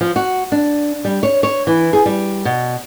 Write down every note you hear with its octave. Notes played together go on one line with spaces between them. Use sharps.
F3
F#4
D4
G3
C#5
C#5
E3
G#4
G3
B2